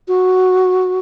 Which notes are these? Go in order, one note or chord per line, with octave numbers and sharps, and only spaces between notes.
F#4